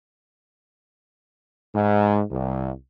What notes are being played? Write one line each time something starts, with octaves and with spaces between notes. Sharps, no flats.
G#2
C2